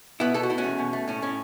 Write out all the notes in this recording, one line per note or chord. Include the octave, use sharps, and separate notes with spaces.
B2 B3 E4
B2 A4
F#4
A3 E4
C#4 F#4
E2
B2
A3
A2 C#4
A2 C#4